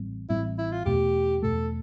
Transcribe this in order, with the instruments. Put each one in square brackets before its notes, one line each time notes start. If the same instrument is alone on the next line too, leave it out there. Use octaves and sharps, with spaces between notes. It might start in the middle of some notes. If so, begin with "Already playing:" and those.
Already playing: [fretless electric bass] A1 A2 G3 C4
[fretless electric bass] A1 A2 G3 C4 [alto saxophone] E4
[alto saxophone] E4
F4
[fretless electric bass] E2 B2 A3 [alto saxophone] G4
[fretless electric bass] E2 B2 A3 [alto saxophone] A4